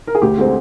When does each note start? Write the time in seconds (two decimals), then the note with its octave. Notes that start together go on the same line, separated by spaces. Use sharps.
0.07 A#4
0.15 G#4
0.22 D2 G4
0.38 D3 G#3 C4